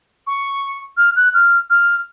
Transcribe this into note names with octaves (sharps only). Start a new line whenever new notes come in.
C#6
F6
F#6
F6
F6